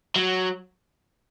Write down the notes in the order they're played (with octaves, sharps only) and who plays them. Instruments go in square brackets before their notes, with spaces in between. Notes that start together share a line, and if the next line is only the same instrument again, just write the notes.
[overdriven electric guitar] F#3